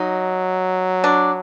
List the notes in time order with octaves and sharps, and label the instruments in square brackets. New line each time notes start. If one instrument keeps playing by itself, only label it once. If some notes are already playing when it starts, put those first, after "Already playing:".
Already playing: [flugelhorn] F#3 [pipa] D#4
[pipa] D4